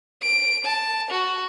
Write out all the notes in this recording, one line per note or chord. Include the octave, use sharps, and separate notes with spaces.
D7
A5
F#4